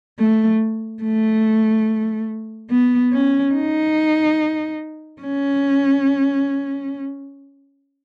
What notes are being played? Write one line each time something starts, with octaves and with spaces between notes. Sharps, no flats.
A3
A3
B3
C#4
D#4
C#4